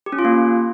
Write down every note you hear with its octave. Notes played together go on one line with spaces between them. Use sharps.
G4
C#4
F4
A#3